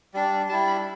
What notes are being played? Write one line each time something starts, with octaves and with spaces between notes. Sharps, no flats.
G3 D4
G3 E4 A5
B5